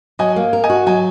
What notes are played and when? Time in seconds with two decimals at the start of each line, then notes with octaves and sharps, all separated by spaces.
0.19 F#3 D#5 G#5
0.36 A#3
0.53 A#4
0.64 D#5 G#5
0.70 F#4
0.86 F#3 D#5 G#5